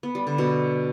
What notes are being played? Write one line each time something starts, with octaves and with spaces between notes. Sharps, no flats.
B3
G3
D3
B2